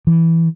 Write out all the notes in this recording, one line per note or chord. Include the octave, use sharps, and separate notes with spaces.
E3